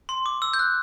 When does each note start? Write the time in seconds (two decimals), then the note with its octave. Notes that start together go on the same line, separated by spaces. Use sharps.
0.09 C6
0.26 D6
0.42 E6
0.54 G6
0.59 F#6